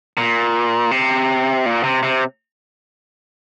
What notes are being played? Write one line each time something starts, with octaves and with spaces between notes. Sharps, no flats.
A#2
C3
A#2
C3
C3